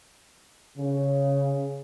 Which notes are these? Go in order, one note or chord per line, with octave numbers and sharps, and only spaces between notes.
C#3